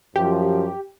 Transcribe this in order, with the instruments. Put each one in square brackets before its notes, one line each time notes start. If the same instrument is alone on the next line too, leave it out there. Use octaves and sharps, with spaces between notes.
[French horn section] F#2 F3 [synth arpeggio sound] G4